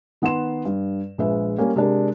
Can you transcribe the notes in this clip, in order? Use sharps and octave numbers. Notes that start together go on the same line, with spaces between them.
D#3 B3 F#5 C6 E7
G2
A#1 G#3 B4 E5
G3 A#3 C#4
C3 G#3 D4 A#4